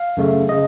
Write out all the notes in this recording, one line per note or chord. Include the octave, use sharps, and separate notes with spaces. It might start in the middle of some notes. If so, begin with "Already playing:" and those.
Already playing: F5
F#2 C#3 A3
C#3 D#5